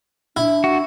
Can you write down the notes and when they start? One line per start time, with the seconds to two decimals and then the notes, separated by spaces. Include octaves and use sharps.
0.37 D4 E4
0.64 F#4